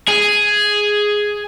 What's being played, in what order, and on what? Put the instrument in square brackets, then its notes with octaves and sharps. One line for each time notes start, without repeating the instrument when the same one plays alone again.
[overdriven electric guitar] G#4